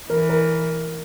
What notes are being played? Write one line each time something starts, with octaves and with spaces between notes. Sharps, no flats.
E3 A#4
A#4